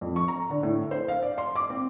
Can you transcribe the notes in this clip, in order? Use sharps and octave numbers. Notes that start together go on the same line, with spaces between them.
F2
C#6
A#5
D3
A2
C5
F5
D5
C6
D6
C4